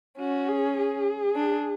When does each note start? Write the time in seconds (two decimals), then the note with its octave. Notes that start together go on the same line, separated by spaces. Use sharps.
0.18 C#4 F#4
0.48 G#4
0.77 G#4
1.35 D4